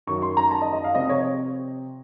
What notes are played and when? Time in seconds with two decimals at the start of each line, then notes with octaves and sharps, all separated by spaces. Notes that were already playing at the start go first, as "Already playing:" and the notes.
0.07 F#2 D#3 F#3 C#6
0.22 C6
0.37 A#5
0.51 A5
0.62 D#5
0.73 D#5
0.84 F5
0.95 C3 F3 C4 D#5
1.09 C#5